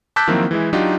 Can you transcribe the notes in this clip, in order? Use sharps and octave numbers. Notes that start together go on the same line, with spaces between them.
A5 D6 E6 F#6 G6 B6
D#3 F3 F#3 A#3 C4 E4
E3 G#3 E4
F#3 D4 D#4 F4 G4